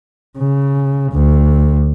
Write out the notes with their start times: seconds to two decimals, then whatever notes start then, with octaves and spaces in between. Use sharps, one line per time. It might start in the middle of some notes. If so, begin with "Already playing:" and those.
0.38 C#3
1.12 D2